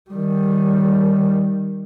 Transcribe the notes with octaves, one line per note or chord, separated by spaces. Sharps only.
D#3 G3